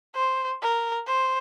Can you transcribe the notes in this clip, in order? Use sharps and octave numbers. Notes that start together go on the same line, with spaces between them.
C5
A#4
C5